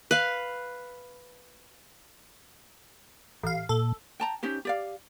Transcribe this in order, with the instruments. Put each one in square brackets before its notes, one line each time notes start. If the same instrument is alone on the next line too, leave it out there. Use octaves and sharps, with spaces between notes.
[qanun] B4 F5
[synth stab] A1 F5
[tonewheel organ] A#2 [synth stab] A4
[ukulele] G5 A5 A#5
C#4 D#4 G4 C5
G4 D5 F5